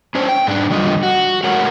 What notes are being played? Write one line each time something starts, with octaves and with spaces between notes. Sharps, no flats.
C#4 D4 C5
G5
G#2 D4
E2 D3 G3 F4 D#5
F#4
G#3 A3 A#4 C#5 F#5